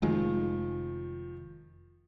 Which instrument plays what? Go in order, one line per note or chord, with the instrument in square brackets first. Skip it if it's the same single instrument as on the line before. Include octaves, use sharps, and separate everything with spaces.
[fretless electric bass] F1 G#3 [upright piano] D#3 F3